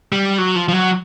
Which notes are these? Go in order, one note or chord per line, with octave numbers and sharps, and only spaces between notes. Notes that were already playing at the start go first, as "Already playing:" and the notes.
G3
F#3
F3
F3
F#3